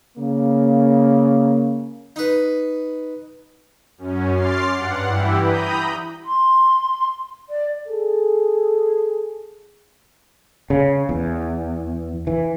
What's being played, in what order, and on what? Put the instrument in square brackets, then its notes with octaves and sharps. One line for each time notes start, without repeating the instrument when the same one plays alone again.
[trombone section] C#3 A#3
[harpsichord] D#4 B4
[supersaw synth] F#2 C#4
C6 D6 F6 A6 C7
G2 F#5
E3 E4 G4
A#5 B5 D#6 G6
[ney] C6
D5
[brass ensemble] G#4 A4
[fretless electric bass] C#3
E2
E3